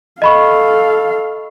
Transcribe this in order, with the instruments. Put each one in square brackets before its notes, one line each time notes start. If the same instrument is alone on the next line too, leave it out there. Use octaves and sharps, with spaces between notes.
[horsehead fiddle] A4 F5 [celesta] D#5 B5 C#6